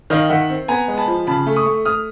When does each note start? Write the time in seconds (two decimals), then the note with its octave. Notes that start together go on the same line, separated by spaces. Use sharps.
0.10 D#3 D#5 F5
0.30 D#3 E5 F#5
0.50 C4
0.68 B3 G#5 A#5
0.88 G#3
0.98 A5 B5
1.08 F3
1.27 C#3 A5 B5
1.47 A3
1.56 C#6 D#6
1.66 A3
1.85 A3 D#6 F6